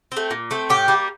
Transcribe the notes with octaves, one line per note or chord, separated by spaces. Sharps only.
A3 C4
A#2
A3 C4
A2 G4
G3 A#3